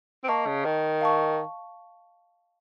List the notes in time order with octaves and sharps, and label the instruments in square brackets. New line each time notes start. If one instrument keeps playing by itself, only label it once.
[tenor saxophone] C4
[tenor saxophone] A#3 [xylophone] D#5 A5 C#6
[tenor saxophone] C#3
D#3
[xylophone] F5 A5 C#6